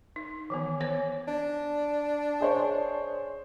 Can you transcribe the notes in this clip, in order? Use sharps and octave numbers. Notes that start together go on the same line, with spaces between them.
D#4
D#3 E3 B3
B3 C5 C#5
D4
G#4 C5 C#5